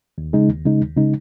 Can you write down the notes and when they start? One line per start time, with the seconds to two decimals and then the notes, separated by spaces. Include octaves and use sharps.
0.18 D#2
0.33 C#3 G#3 D#4
0.49 D#2
0.65 C#3 G#3 D#4
0.80 D#2
0.97 C#3 G#3 D#4